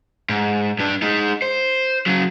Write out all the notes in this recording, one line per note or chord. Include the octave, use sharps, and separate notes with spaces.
G#2
G2 D4
G#3 D#4
C5
C#3 F#3